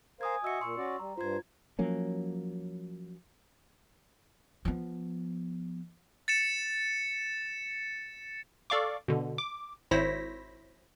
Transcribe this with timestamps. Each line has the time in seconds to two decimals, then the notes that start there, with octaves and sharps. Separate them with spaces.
0.21 A#4 C5 F5 G#5 D#6 G#6
0.44 F#4 D#5 E5 E6 C#7
0.61 A#2 C6 C#6 E6
0.77 C#4 F#4 D5
0.99 G3 A#5
1.18 G2 F4 C5 G#6
1.79 F3 F#3 A#3 C#4
4.65 F3 B3
6.28 A6 C#7 E7
8.70 A4 D5 F5 C#6 D6
9.08 B2 D3
9.38 D6
9.91 G#1 E4 C5 C#5 A#6 B6